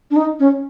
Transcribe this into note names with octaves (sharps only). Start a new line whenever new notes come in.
D4
D#4
C#4